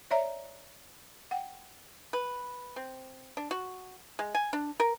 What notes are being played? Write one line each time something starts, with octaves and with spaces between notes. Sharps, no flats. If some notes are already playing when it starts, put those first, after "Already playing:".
C#5 D5 E5 A#5
F#5 G5
B4
C4
D4
F#4
G#3
G#5
D4
A#4